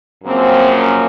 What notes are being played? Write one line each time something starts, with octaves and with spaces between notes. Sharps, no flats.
F#2 C#3 F3 A#3 C4
C#4